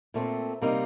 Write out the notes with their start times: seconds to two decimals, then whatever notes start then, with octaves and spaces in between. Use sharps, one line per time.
0.14 A#2 A3 C4
0.62 C3 G3 A#3 D#4